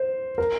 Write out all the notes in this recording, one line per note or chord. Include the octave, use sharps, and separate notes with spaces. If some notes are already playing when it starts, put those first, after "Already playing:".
Already playing: C5
A#4